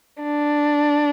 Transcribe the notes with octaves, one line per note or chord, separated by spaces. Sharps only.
D4